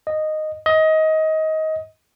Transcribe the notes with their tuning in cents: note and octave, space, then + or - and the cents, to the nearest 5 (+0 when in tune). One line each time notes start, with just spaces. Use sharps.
D#5 -10
D#5 +20